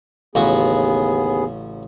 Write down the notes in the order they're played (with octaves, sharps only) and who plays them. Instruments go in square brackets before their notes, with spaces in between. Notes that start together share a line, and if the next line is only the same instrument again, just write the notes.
[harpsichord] A1 C#3 F#4 [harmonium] D#2 B3 G#4